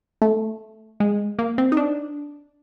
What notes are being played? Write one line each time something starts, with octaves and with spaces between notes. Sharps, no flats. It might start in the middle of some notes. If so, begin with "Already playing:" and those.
A3
G#3
A#3
C4
D#4
D4